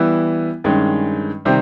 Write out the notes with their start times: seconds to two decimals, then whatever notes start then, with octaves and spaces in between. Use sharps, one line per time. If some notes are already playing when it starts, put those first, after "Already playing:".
Already playing: E3 G3 B3 E4
0.64 G2 D#3 G#3 C#4
1.45 C3 D#3 G3 C4